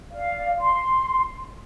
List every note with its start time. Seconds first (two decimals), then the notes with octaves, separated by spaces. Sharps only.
0.12 D5 F5
0.59 C6